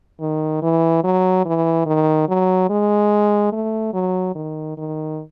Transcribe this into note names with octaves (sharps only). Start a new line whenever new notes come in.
D#3
E3
F#3
E3
D#3
F#3
G#3
A3
F#3
D#3
D#3